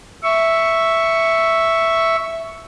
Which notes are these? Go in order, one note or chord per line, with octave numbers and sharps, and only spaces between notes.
E5 C#6